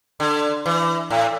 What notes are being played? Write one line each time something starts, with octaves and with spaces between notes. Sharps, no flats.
D3
E3
A2